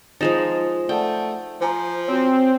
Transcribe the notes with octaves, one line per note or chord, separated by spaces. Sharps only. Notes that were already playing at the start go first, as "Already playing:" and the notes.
F3 G#3 D#4 A6 E7 F7
A3 D5 F#5 G5 A5
F3 C5 G#5 A#5
C4 F#4 C#5